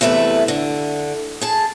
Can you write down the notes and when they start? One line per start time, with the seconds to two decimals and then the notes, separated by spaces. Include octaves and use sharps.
0.01 E2 C3 A3 B4 E5
0.48 D3
1.41 G#4 A5